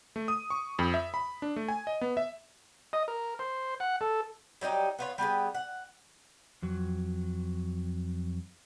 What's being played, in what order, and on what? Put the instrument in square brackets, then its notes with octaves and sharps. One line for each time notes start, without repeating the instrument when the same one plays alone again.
[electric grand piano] A3
D#6
C#6
F2
E5
B5
D4
A3
G#5
D#5
B3
E5
[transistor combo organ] D#5
A#4
C5
F#5
A4
[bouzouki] F#3 G3 D#4 G4
B3 F4 C#5
G3 B3 G4 G#4
F#5
[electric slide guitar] F2 F#3